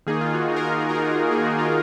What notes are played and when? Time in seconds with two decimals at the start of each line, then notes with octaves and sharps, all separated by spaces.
0.07 D#3 A#3 D#4 G#4
0.21 F4
0.34 F#4
0.48 D#3 A#3 D#4 G#4
0.56 A#4
0.65 G#4
0.73 A#4
0.80 G#4
0.89 D#3 A#3 D#4 A#4
0.97 G#4
1.31 D#3 A#3 D#4 G#4
1.46 F#4
1.59 F4